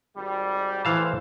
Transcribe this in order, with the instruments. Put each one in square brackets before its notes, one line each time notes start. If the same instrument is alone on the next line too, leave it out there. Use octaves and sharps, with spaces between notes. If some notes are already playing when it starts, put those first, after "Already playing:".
[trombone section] G#1 G3
[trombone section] A2 C5 [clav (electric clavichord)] E3 F5 A5